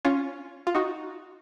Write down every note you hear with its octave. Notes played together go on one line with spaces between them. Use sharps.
C#4 F4
F4
D#4 F#4